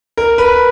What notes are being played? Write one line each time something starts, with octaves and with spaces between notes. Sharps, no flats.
A#4
B4